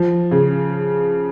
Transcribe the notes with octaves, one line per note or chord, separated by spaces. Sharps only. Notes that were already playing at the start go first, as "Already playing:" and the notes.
Already playing: F3
C#3